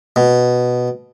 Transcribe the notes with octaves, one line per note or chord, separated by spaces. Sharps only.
B2